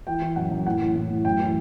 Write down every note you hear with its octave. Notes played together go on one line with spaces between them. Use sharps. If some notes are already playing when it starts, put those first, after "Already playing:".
E3 G5
E3
F#2 F#5
F#2
A2 F#5
E3
A2
A2
F#2 G5
E3